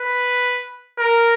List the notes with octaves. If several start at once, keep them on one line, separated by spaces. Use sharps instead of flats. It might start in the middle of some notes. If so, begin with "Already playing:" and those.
Already playing: B4
A#4